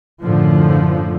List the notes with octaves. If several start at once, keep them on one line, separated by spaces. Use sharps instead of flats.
F#2 A2 D3 F3